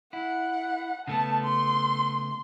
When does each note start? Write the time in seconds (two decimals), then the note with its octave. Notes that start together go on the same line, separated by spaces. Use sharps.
0.13 E4 F#5
1.07 C#3 A3 B3 A5
1.44 C6